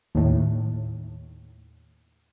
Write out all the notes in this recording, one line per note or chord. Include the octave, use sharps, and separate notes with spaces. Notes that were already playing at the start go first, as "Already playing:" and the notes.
D#2 A2